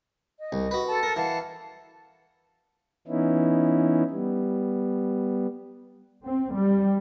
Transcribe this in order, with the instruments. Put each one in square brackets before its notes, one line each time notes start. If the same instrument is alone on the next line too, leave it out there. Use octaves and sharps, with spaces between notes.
[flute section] D#5
[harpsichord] C2
F#4 B4
[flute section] A4 A5
[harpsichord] A#4
[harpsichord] E3 [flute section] F5 F#5 A5
[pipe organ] E3 B3 C#4 D#4 E4
G3 B3
[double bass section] C4
G3